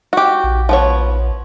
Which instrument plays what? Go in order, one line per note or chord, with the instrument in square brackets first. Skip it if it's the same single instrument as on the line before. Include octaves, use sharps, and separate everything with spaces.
[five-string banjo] F#4 G4
[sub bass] A#1
[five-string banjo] F3 B3 C#5